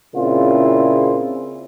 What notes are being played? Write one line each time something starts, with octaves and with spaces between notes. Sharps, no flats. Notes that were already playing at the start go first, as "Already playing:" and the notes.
A#2 C#3 C4 E4 F4 G#4